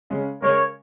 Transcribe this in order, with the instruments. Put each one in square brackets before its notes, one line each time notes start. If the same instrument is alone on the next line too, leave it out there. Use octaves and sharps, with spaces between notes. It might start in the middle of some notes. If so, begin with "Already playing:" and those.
[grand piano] C#3 G#3 C#4
[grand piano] C#3 G#3 C#4 [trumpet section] A#4 C#5